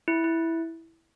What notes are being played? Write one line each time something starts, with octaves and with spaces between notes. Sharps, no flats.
E4
E4